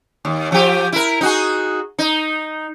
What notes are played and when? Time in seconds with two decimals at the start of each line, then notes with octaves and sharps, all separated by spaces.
0.25 D#2
0.52 F3 G4
0.92 E4 A#4
1.21 D#4 F#4 G#4
1.99 D#4